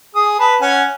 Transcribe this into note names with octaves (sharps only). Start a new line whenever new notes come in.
G#4 D#6
B4 A5
C#4 F#5 G#5